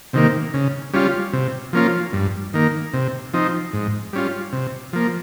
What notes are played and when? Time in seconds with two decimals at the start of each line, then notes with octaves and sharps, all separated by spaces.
0.13 C3 D#3 A#3
0.54 C#3
0.94 G3 C#4 F4
1.33 C3
1.73 F3 A#3 C#4 F4
2.13 G2
2.54 D#3 A#3
2.94 C3
3.33 F3 C4 D#4
3.73 G#2
4.13 G3 C#4 F4
4.53 C3
4.93 F3 A#3